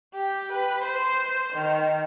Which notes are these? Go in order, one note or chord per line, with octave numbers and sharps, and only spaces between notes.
G4
B4
C5
D#3